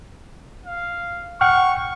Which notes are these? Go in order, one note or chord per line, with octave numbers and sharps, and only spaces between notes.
F5
F#5 G5 C#6 F6